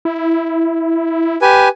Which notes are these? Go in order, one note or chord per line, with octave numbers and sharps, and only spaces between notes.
E4
G4 B4 G#5